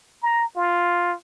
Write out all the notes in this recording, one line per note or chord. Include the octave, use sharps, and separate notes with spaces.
A#5
F4